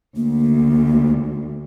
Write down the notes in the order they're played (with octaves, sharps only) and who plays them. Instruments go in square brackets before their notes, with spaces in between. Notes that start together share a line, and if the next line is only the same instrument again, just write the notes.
[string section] D2 [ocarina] A#3